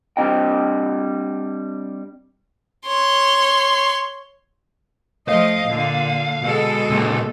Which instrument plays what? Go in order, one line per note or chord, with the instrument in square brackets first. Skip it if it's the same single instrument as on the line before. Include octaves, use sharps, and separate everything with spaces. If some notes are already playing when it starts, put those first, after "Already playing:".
[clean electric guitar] G3 C4 D4 D#5 G5
[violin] C#5 C6
[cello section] F3 A3 D#5 [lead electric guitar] F5
[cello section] A#2 D3
B2 G#3 A4
[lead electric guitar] C#2 A#2